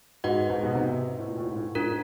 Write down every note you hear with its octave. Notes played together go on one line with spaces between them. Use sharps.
G#2 F#4 B4 D#5 F#5
G#2
B2
C3
A2
A#2
A2
G#2
A2
G#2 D4 F4 A#4